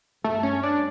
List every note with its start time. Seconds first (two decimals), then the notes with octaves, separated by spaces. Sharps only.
0.24 G2 A3
0.43 C#4
0.63 D4